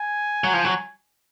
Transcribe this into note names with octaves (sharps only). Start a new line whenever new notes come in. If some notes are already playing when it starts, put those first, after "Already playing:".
Already playing: G#5
F#3
F3
F#3